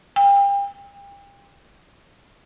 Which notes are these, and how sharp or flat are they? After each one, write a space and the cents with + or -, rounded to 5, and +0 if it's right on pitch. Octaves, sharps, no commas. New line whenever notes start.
G5 +35